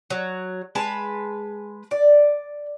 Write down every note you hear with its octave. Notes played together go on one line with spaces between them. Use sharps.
F#3
G#3 B4 A5
D5